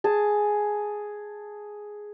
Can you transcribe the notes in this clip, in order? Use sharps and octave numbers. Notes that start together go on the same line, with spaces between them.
G#4 A5